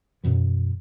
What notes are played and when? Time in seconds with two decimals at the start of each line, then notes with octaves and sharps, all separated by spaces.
0.23 F#2 B2 E3